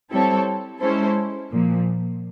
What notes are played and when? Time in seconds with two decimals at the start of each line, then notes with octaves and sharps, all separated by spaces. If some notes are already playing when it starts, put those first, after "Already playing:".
0.10 G3 C4 E4 A4 C#5
0.80 G#3 C#4 E4 A4 C5
1.51 A#2 F3 A#3